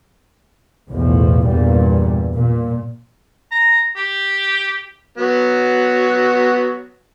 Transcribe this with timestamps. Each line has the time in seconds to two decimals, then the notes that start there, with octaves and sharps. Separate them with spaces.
0.91 B1 E2 A2 F3
1.46 E2 G2 A#2 G3
2.34 A#2
3.52 A#5
3.96 G4
5.18 F#3 B3 F#4